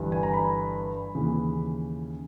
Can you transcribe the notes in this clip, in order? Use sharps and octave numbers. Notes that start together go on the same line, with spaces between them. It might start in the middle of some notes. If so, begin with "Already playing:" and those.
Already playing: G1 G2 E3
G#5
A#5
B5
D#2 C#3 E3